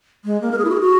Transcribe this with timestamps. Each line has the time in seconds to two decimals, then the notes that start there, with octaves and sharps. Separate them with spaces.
0.25 G#3
0.42 A#3
0.51 A#4
0.58 G#4
0.65 E4
0.70 F#4
0.75 G#4
0.81 F#4